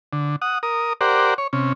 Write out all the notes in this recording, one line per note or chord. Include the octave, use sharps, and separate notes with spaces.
D3
F#5 D#6
A#4 D#6
G4 A#4 C5 D5 F#5
C#5
C3 C#4